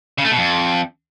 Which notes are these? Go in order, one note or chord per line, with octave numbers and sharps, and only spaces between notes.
C#3
A3
B2
F2